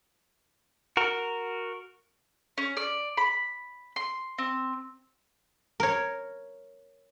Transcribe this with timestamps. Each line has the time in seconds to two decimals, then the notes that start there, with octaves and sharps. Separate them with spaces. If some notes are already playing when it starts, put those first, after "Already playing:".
0.97 F#4 A#4
2.58 C#4
2.77 D5
3.17 B5
3.96 C6
4.38 C4
5.80 A#4 C#5